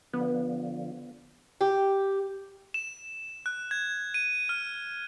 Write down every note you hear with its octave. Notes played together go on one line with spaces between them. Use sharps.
D3 F3 B3
G4
E7
F#6
G#6
D#7
F6